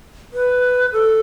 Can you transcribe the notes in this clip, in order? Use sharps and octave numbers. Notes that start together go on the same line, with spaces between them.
B4
A4